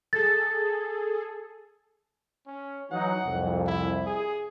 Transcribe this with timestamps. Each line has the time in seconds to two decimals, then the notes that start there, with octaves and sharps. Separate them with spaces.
0.13 G#4 A4 A6
2.47 C#4
2.91 E3 F#3 D#4 F#5
3.24 C2 F2
3.67 E4
4.06 G#4